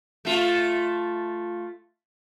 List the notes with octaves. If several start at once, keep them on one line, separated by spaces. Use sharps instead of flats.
A3 F4